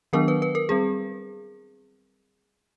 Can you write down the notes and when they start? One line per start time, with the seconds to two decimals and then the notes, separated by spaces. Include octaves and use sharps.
0.13 D#3 F#3 B3 D4 A#4
0.28 B4
0.42 B4
0.55 A#4
0.69 G3 C4 G#4